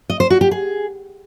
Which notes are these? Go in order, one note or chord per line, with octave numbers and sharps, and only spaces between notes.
D#5
C5
F#4
G4
G#4